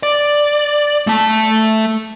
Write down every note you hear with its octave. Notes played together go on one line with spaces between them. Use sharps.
D5
A3 A5